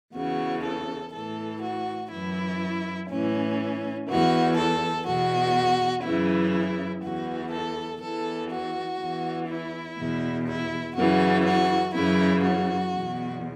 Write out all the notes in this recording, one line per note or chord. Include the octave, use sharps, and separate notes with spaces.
E2 C#3 E3 F#4
A4
A2 E3 A4
F#4
F#2 E3 E4
A2 E3 C#4
E2 E3 F#4
A4
E2 B2 F#4
F#2 C#3 E3 E4
E2 E3 F#4
A4
E2 E3 A4
F#4
E2 E3
E4
E2 B2
E4
F#2 C#3 E3 F#4
F#4
F#2 C#3 E3 E4
F#4
E2 B2